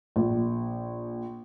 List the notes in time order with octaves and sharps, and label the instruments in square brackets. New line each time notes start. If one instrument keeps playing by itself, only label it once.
[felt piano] A#1